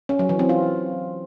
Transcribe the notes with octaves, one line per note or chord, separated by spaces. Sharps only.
C#4
F#3
E3
C4
F4